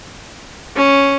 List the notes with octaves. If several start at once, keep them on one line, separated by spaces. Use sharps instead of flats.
C#4